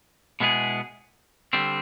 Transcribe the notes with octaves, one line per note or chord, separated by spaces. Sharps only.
B2 G#3 B3 E4 G#4
D3 G3 C4